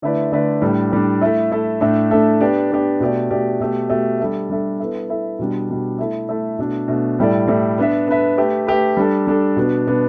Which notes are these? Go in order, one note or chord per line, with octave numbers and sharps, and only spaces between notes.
D3 A3 E4 B4 D5
D3 A3 E4 B4 D5
A2 G3 D4
A2 G3 D4
A3 E4 A4
A3 E4 A4
A2 A3 D4 A4 E5
A2 A3 D4 A4 E5
B3 D4 G4 D5
B3 D4 G4 D5
B2 A3 G4 D5
B2 A3 G4 D5
B2 A3 G4
B2 A3 G4
G3 D4 A4 E5
G3 D4 A4 E5
B3 E4 A4 E5
B3 E4 A4 E5
B2 G3 D4
B2 G3 D4
A3 E4 A4
A3 E4 A4
B2 A3 D4
B2 A3 D4
A2 G3 E4 A4 D5
A2 G3 E4 A4 D5
B3 D4 B4 E5
B3 D4 B4 E5
A3 G4 B4
A3 G4 B4
G3 D4 A4
G3 D4 A4
B2 B3 D4
B2 B3 D4